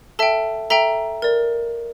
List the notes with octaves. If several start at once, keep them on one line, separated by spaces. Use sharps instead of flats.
A4 E5 G5 A5
A4 E5 G5 A#5
A#4 D5